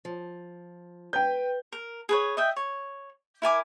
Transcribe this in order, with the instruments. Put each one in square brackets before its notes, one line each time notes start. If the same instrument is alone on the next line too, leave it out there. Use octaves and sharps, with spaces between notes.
[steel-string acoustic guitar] F3
[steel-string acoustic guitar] B4 [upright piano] G5 G6
[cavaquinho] A#4
G#4 B4 C#5
D#5 E5 G5
C#5
E4 A#4 G#5 D6